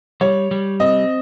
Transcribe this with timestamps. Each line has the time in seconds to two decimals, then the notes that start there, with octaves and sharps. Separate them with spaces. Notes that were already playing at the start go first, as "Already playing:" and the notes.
0.21 G3 C#5
0.51 G3
0.80 C4 D#5